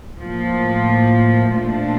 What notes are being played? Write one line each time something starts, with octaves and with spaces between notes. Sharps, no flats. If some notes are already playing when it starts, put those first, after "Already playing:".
A2 F3 A#3
A#2 F3 A3 D4